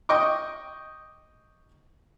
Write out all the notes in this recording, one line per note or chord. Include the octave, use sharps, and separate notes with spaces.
D#5 G5 C#6 D6